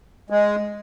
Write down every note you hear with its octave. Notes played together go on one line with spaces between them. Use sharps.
G#3